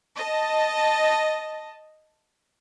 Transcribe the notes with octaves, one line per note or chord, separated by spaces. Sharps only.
D#5 A5